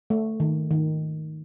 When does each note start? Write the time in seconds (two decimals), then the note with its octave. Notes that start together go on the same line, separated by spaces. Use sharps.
0.10 A3
0.40 D#3
0.71 D#3